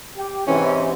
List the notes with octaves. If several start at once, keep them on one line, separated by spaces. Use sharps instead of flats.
G4
G#2 C3 E3 C#4